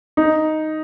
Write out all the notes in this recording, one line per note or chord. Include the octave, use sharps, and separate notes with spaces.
D#4